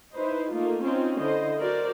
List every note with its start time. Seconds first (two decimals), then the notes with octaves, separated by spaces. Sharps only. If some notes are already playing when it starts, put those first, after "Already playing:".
0.14 D#4 E4 B4 C5
0.52 A3 A#3 D#4 F4
0.82 C4 C#4 D#4 F4 C5
1.19 D3 E4 C5 D#5
1.59 F#4 A#4 C5 D5